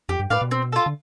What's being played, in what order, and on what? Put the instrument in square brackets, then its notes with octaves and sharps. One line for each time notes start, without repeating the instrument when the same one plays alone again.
[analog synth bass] F2 [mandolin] G4
[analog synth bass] G2
[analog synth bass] A2 [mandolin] B4 D5 F5
[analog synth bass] B2
[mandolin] C4
F4 A4
[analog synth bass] D3